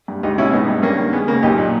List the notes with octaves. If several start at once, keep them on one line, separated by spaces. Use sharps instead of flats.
G2
C#2 D#4 G4
B2 C#4 E4
G#1 B3 D#4
G2
G2 A#3 C#4
D#3
G#3 B3
C#3 A#3
B1 D#4 G4
A#2